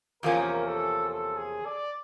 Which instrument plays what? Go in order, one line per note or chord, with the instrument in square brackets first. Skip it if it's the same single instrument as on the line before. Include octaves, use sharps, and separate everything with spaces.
[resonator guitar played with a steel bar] E2 C3 F3 A#3 C#4 [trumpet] A#4
[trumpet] A4
A4
G#4
D5